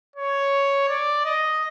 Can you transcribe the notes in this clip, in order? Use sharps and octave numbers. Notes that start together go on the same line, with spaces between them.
C#5
D5
D#5